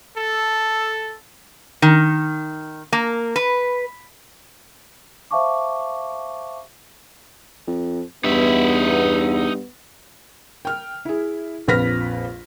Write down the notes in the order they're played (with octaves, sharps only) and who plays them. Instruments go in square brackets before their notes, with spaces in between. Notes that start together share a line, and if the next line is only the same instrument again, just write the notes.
[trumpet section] A4
[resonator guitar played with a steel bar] D#3
A#3
B4
[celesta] C5 E5 F5 A5 C#6 D6
[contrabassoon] F2
[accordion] E2 [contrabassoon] G2 [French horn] B3 [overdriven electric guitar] D#4 E5
[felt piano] G5 F6
E4 G#4
A#1 F2 B4 F6 A#6 B6